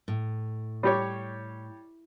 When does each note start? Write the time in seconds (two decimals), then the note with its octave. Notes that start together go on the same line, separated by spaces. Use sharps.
0.08 A2
0.83 G3 G4 C#5